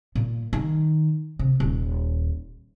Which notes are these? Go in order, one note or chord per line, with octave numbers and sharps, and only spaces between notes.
A#2
D#3
C3
D#1